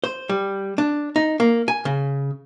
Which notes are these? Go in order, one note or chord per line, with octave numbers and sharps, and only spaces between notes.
C5
G3
D4
D#4
A#3
G#5
C#3